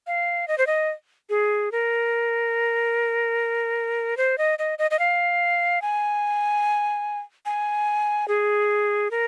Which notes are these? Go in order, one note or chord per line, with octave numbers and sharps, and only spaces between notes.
F5
D#5
C5
D#5
G#4
A#4
C5
D#5
D#5
D#5
D#5
F5
G#5
G#5
G#4
A#4